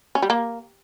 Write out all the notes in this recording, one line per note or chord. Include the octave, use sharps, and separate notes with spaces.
C#4
G3
A#3